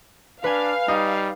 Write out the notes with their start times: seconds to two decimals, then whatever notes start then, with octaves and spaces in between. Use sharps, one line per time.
0.44 D4 B4 F5 G#5
0.88 G3 D#4